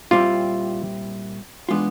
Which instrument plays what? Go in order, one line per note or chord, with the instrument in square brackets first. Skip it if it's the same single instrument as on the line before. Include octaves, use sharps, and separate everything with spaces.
[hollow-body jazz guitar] A#2 G3 C4 E4 G4 [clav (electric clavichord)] F4
[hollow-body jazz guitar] E3 G#3 B3 D4 F4